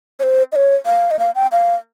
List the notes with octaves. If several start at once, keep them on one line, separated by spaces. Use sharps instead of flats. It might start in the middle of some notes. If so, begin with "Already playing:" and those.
C#5
C5
D#5
C#5
F5
D#5
F5
G5
F5